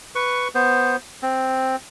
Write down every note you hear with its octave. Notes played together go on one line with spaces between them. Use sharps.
B4 C#6
B3 C5
C4